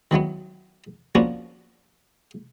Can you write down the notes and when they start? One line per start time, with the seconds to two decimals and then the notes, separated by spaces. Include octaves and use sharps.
0.11 D#3 E3 F#3 B3
1.15 F3 A#3 B3 C#4 D4 F#4